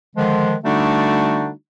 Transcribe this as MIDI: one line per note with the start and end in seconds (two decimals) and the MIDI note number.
0.16 0.55 50
0.16 0.55 51
0.16 0.55 53
0.16 0.55 56
0.64 1.51 50
0.64 1.51 55
0.64 1.51 57
0.64 1.51 62
0.64 1.51 63
0.64 1.51 66